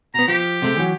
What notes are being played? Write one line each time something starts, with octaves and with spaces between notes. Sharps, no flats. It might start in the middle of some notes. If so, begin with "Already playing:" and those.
B2 B3 A#5
F3 G4
C3 G#3 A3
E3 F#3